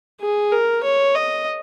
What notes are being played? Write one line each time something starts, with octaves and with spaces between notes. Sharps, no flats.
G#4
A#4
C#5
D#5